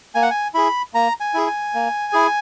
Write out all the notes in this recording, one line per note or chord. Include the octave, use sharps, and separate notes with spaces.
A#3 G#5
F#5
G#5
E4 G#4 B5
A#3 A#5
G#5
E4 G#4
G#5
A#3
E4 G#4